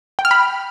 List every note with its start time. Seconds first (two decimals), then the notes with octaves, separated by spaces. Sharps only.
0.19 G5
0.25 F6
0.31 B5